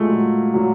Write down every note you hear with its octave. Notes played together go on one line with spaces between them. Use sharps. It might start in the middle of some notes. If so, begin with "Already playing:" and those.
Already playing: A#2 G#3 A3
F#3
A#2 F#3